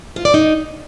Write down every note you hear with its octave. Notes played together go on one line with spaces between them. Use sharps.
F4
D5
D#4